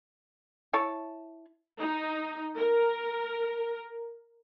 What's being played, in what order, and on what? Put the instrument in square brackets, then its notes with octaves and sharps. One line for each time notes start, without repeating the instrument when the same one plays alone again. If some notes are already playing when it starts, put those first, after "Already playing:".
[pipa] E4 C#5 A5
[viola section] D#4
A#4